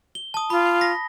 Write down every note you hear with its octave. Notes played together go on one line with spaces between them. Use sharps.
G7
A5 D#6
F4 B5
A#6 B6